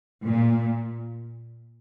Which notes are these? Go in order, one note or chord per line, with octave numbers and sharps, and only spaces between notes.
A#2